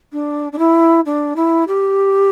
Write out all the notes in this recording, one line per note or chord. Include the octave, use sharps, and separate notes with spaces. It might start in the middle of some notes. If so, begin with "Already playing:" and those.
D4
D4
E4
D4
E4
G4